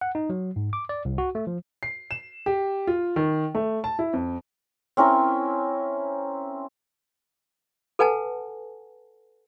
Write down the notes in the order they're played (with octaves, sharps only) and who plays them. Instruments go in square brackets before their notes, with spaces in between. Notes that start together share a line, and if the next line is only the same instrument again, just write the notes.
[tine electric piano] F#5
D#4
F#3
G#2
D6
D5
C2
F#4
A3
F3
[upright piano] C7
E7
G4
F4
D#3
A3
A5
E4
F2
[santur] C4 C#4 E4 A#4
[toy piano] A4 B4 F#5 G#5 A5